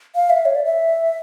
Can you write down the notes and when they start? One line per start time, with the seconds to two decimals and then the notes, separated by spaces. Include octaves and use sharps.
0.15 F5
0.30 E5
0.46 C#5
0.55 D5
0.65 E5